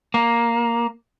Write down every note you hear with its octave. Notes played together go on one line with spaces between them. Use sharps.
A#3